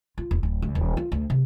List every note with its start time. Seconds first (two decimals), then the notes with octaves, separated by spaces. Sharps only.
0.18 F4
0.31 D#1
0.43 D1
0.62 C#2
0.75 D#1
0.97 F4
1.12 D2
1.30 C3